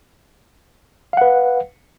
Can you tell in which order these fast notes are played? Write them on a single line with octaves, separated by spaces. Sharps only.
F5 F#5 B4